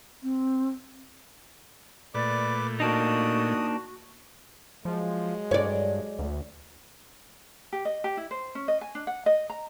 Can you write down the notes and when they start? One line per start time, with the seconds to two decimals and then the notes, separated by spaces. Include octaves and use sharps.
0.23 C4
2.15 A#2 A3 B4 D5 D6
2.80 A#3 D4 D#4 F#4 D#6
4.85 F3 F#3 G#3
5.51 G2 C#5 D5
6.19 D2
7.73 G4
7.85 D#5
8.04 G4
8.17 E4
8.31 C5
8.55 C#4
8.68 D#5
8.81 G#5
8.95 D4
9.07 F#5
9.26 D#5
9.50 A#5